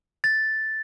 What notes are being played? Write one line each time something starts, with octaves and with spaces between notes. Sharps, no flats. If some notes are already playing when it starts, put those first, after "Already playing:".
A6